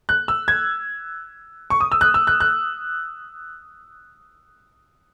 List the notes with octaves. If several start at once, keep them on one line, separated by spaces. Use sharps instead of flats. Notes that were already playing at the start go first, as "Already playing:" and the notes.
F#6
E6
G#6
C#6
D#6
E6
F#6
E6
F#6
F#6